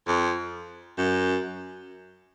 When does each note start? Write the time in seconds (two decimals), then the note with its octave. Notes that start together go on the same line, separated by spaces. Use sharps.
0.07 F2
0.98 F#2